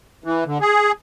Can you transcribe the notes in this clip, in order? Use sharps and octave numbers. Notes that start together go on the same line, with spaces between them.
E3
D3
G#4